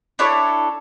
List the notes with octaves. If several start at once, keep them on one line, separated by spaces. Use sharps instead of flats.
D4 E4 A4 C#5